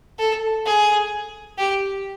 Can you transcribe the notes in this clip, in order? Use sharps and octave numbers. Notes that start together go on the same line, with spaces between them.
A4
G#4
G4